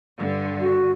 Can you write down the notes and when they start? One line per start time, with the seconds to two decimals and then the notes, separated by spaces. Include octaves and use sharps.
0.18 G2 D3
0.60 F#4